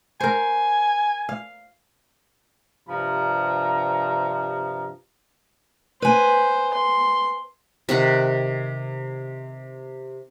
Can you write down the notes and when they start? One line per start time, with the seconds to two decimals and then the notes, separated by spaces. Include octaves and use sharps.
0.20 A#4 C5 G#5
1.29 F5
2.88 G2 C3 F3 A#5
6.02 B4 C5 G#5
6.73 C6
7.89 C3 D#3 F#5